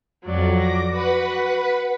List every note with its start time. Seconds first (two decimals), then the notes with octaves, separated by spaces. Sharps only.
0.25 F2 F#3 D5
0.54 D6 A#6
0.90 F#4 B4 F#5 B5